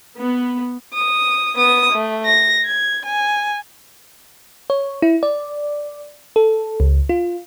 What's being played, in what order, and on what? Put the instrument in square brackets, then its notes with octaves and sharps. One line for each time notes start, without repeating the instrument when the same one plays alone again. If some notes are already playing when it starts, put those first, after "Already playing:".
[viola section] B3
[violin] D#6
B3 D#6
A3
A#6
G#6
G#5
[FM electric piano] C#5
E4
D5
A4
C#2
F4